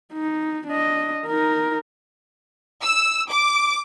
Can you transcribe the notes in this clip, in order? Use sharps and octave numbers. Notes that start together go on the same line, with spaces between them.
D#4
D4 D#5
D#4 A#4
E6
D6